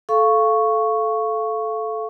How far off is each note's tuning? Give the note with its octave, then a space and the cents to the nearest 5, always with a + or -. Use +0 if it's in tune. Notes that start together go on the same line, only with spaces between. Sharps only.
A4 -15 F5 -10 C#6 +0